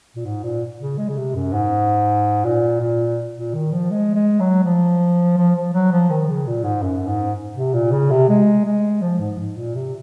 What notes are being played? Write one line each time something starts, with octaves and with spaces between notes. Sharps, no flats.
A#2
G#2
A#2
C#3
G#3
C#3
C3
F#2
G#2
A#2
A#2
A#2
D#3
F3
G#3
G#3
F#3
F3
F3
F3
F#3
F3
D#3
C#3
A#2
G#2
F#2
G#2
C3
A#2
C#3
C3
G#3
G#3
F3
G#2
G#2
A#2
C3